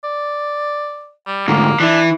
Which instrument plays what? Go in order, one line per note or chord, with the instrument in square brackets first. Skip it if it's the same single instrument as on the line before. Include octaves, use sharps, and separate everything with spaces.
[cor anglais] D5
G3
[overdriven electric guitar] D2 G#2 [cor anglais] A#3
[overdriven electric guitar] E3 E4 [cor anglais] D4